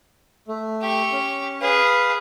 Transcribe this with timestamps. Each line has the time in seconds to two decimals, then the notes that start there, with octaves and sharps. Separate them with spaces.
0.48 A3
0.81 G4 C#6
1.13 C#4
1.61 G#4 B4 F5